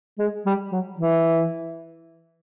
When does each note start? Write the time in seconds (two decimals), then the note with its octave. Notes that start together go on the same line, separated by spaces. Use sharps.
0.19 G#3
0.46 G3
0.72 F#3
0.99 E3